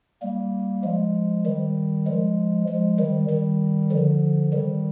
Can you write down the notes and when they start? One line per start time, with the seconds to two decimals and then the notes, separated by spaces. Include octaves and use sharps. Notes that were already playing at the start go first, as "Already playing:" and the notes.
0.22 G3 A#3
0.84 F3 G#3
1.46 D#3 G3
2.07 F3 G#3
2.68 F3 G#3
2.99 D#3 G3
3.30 D#3 G3
3.91 D3 F3
4.53 D#3 G3